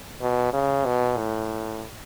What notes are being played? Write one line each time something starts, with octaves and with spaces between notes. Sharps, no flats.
B2
C#3
B2
A2